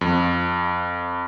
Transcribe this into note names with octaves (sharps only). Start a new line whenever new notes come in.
F2